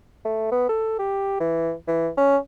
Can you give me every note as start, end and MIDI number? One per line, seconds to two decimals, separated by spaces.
0.25 0.47 57
0.51 0.69 59
0.69 0.96 69
0.99 1.35 67
1.40 1.72 52
1.87 2.09 52
2.17 2.37 61